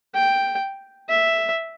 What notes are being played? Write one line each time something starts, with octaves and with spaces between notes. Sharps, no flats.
G5
E5